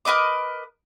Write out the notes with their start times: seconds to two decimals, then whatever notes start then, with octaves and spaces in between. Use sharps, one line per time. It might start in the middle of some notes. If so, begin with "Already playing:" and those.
0.05 A#4 B4 D#5 D6